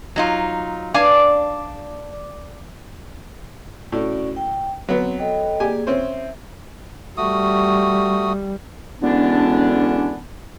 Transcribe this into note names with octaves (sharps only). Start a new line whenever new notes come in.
F#3 D#4 F4
D4 D5 F5 G#5
A2 C#4 F#4 D5
G5
F#3 B3 C4
A4 D#5 G5
A#3 G4 G#4 D5 G#5
C4 C#4 C5 E5
G3 A3 F#4 D#6
E1 D3 B3 C#4 D4